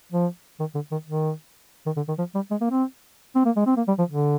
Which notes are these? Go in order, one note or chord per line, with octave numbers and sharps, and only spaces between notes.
F3
D#3
D3
D#3
D#3
D#3
D3
D#3
F3
G3
G#3
A#3
C4
C4
A#3
G#3
C4
A#3
G3
F3
D3